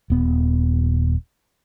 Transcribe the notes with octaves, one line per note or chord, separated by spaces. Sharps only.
D#1 B3